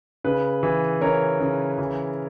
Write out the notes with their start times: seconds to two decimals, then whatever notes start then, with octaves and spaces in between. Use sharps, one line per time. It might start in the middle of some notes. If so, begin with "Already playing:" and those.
0.24 C#3 B4
0.63 E3
1.01 C#3 A#4 C#5
1.40 C#3
1.78 E3